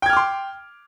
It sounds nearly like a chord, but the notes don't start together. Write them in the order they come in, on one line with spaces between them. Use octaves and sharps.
G5 G#6 F6 D6 C6